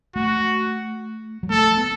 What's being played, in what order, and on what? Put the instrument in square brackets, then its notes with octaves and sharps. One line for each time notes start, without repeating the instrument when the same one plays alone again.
[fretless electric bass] A3 [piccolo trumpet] F#4
[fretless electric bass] F#3
[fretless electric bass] A3 [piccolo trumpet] A4
[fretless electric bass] B3